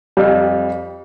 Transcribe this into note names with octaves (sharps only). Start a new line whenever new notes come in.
F2 G3